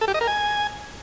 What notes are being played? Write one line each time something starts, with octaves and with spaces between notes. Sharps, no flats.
A4
G4
D#5
A#4
G#5